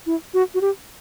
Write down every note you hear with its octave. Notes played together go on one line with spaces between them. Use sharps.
E4
F#4
F#4
G4